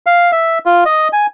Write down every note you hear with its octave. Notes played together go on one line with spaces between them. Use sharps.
F5
E5
F4
D#5
G#5